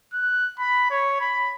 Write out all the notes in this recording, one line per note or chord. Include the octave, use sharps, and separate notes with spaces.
F#6
B5
C#5
B5